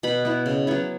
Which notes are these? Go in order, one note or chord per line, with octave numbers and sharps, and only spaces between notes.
B2 B5
B3 E4
C#3
F#3 B3 E4